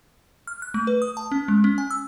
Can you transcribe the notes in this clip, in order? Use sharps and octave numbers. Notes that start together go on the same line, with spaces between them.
F6
F#6
A3
B4
D#6
A5
C#4
G#3
C#4
G#5
E6